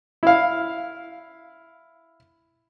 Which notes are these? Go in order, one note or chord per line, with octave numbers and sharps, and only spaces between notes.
E4 F5